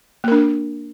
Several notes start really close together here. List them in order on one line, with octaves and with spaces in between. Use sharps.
A#3 A#4 D4